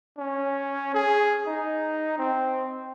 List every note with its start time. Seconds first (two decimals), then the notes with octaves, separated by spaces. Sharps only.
0.18 C#4
0.94 G#4
1.47 D#4
2.18 C4